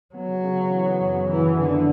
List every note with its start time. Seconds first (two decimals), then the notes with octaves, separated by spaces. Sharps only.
0.14 F#3 B3
0.29 C#3
0.44 C#3
0.58 B3
0.71 E3
0.86 B3
1.01 F#2
1.15 C#3
1.29 F#2 E3
1.43 B3
1.58 F#2 D3
1.72 E3